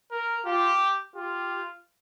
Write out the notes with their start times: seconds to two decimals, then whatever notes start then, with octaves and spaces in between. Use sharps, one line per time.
0.11 A#4
0.45 F4 G4
1.15 F4 G4